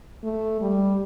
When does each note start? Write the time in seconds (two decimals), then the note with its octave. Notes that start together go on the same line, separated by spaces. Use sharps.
0.23 A3
0.61 G3